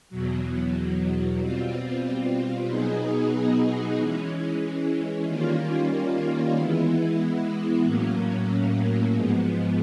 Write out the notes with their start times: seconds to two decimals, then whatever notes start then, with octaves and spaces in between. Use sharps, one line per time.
0.10 E2 B2 F#3
1.39 B2 G3 C4 F4
2.68 B2 F#3 B3 D#4 G#4
3.98 E3 G#3 C#4
5.26 D#3 G3 A#3 C#4 F4
6.56 E3 G#3 B3 E4
7.85 A2 F#3 A#3 C#4
9.14 G#2 F3 G#3 B3